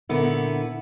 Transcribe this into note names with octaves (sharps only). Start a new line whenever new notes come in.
A#2 D3 B3 E4